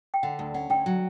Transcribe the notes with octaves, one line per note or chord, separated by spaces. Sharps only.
G5
D3 F#5
D2
C#4 F#5
D2 G5
F#3